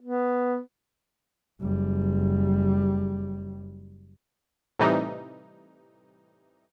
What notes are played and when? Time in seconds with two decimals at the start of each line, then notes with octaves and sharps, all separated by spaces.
0.02 B3
1.61 F#1 G3
4.79 A2 C3 E3 G3 D#4